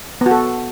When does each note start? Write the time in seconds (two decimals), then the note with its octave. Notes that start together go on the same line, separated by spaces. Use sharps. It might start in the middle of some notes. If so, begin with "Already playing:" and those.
0.21 B3
0.26 F#4
0.31 A4